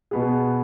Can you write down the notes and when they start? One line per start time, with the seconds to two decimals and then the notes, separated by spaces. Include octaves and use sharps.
0.11 B2 B3 G#4